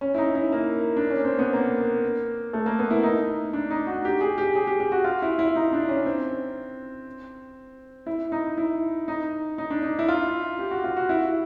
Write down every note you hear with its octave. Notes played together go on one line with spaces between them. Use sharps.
C#4
E4
D#4
E4
A#3
D4
C#4
C4
B3
A#3
A3
A#3
B3
E4
D#4
D4
D#4
F#4
G4
G#4
G4
G#4
G4
G4
F#4
F4
E4
E4
D#4
D4
C#4
C4
E4
D#4
E4
D#4
D#4
D4
D#4
E4
F4
G4
F#4
F4
F#4
E4